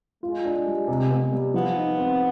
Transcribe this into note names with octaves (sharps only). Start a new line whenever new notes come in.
G#3 F4
D4
G3
C3
B3
G3
F3 B3
D#4
C4